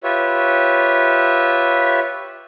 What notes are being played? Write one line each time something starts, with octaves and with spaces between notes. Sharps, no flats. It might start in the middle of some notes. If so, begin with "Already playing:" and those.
F4 G4 B4 C#5 E5